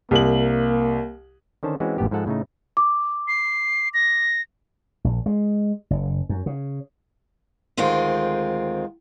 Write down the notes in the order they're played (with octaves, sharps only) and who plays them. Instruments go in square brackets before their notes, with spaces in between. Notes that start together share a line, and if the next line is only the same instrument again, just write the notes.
[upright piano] C2 F#7 [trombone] A#3
[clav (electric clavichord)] D3 D#3 C#4 C5 A5
E3 G#3 C4 C#4 E4 F#4
A1 F#2 A2 B3 G4
G#2 F3 G#3 A4 F#5 A5
A2 C#3 A3 D#4
[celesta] D6
[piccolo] C7
A#6
[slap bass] A#1
G#3
F#1
F#2
C#3
[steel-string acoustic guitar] D2 D#3 G#3 C4 F4